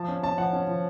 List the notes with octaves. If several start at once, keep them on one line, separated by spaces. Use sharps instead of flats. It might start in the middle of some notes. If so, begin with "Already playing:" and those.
Already playing: F3 A5
C#4
C#4 A5
F3 F#5
C#4
F3